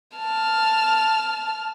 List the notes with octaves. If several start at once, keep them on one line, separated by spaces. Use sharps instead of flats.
A5 F6